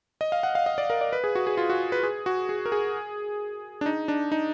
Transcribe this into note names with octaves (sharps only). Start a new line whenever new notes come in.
D#5
F5
F#5
F5
D#5
D5
A#4
D5
B4
G#4
F#4
G#4
F4
F#4
B4
G#4
F#4
G#4
A#4
G#4
D4
D#4
D4
D#4